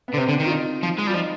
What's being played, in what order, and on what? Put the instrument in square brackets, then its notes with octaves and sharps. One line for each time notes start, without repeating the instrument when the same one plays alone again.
[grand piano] B3
[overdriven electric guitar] D3
[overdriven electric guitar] C3 [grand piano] C4
[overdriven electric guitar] D3
D#3
[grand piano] F4
D#4
[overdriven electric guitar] F3
G#3
[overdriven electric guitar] G3 [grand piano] F4
[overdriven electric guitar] F3 [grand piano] D#4